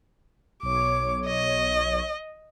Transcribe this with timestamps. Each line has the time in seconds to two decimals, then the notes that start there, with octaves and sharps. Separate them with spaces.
0.63 B1 C#5 D6
1.26 D#5